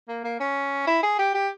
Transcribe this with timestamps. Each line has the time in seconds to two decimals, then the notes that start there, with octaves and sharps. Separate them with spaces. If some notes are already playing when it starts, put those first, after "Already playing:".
0.08 A#3
0.24 A#3
0.40 C#4
0.87 E4
1.03 G#4
1.18 G4
1.34 G4